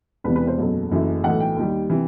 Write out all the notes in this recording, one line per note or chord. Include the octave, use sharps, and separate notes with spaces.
E1 E2 C3 E3 B4
B4
C5
F#1 E2 B2 F#3 A3
F#1 F#2 E3 A3 E4
B1 A2 E3 A3 F#5
G5
D#2 D#3 G3
C3 E3